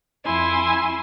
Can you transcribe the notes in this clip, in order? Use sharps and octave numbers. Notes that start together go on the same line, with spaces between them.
F2 E4 G#5 C6